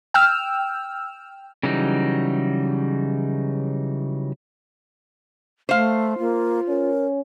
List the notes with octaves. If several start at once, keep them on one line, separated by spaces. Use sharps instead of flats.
G5 E6 F6
C#3 E3 F#3 G3 D#4
A3 C5 F5
A#3 F4
C#4 A#4